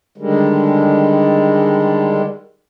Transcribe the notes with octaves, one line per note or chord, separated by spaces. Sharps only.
D3 D#3 G3 G#3